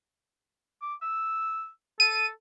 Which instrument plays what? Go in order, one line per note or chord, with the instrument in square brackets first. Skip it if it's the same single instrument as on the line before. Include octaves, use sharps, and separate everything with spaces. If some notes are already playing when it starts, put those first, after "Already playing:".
[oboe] D6
E6
[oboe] A4 [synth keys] D#7